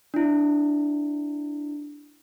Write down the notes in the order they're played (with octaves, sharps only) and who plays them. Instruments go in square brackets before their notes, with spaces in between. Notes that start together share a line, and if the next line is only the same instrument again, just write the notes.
[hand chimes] D4 E4